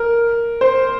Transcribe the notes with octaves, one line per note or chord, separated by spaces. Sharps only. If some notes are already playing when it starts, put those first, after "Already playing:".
Already playing: A#4
C5